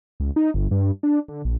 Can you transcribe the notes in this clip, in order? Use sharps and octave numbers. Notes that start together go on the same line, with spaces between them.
C#2
D#4
G1
G2
D4
D3
A#1